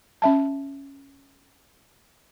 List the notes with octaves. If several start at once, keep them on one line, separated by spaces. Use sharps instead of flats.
C#4 E5 A5